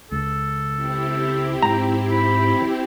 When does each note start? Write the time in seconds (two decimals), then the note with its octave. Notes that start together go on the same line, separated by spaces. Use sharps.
0.11 C#2 A4
0.74 C4 E4 G4
1.62 G#2 A#5
2.12 B5